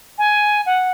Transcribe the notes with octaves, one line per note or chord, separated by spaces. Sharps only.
G#5
F#5